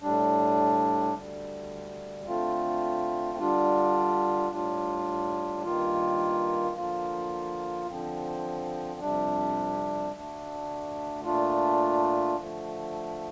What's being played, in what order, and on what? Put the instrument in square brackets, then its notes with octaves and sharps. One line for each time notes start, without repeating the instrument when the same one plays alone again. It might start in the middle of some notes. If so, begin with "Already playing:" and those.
[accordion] A2 G3 D4
D2 D3 G3
D3 A3 C4 F4
D3 G3 D4 F4
A2 G3 D4 F4
G2 D#3 A#3 F4
D3 F3 A#3 F4
D3 F3 C4
F2 C3 G3 D4
D2 D3 A3 D4
A#2 A3 D4 F4
D3 F3 A3